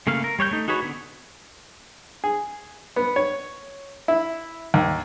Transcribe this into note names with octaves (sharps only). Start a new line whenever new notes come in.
C#3 A3 A#3 F5
A#4
G3 C#5 F5 G6
A3 D#4
D#4 F#4 G#4 B4 C#5
D3 B3
G#4
B3
C#5
E4
D#2